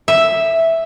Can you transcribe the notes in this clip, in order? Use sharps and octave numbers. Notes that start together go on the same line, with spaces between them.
E5